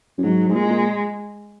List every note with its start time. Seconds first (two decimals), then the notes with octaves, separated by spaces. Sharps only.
0.18 F#2
0.23 G#2 F#3
0.49 G#2
0.54 A#2 G#3
0.69 A#2